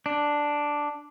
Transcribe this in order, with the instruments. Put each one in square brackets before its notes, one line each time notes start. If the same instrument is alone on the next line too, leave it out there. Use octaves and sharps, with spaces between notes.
[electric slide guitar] D4